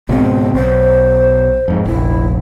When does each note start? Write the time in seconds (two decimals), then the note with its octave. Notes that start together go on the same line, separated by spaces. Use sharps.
0.09 G#1 C#2 B2 C4
0.55 B1 C5
1.68 F2 G#2
1.86 F1 A#1 E4